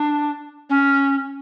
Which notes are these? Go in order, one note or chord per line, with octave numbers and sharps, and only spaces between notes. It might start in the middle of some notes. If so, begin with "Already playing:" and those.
Already playing: D4
C#4